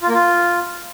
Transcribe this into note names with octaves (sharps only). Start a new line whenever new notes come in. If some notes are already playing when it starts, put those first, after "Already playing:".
F4
A#3
F4